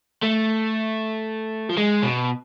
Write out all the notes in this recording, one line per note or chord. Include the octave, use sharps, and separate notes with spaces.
A3
F3
G#3
B2